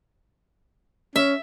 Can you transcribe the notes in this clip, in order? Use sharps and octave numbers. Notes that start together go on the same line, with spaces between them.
C#4 E5